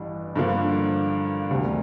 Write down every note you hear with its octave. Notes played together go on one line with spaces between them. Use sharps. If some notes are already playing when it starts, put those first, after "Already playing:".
Already playing: A1 G2 E3 G3 D4
G2 D3 F3 A#3
E1 D2 C3 G3